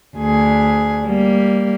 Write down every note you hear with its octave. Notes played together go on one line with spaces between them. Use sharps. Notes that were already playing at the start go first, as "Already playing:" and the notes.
D2 G#4
G3 A#3